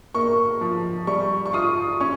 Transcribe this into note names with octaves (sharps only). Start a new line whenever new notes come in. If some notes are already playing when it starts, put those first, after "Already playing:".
A#3 C#6
F3
G3 C#6
C#6
F4 D#6
C#4 C#6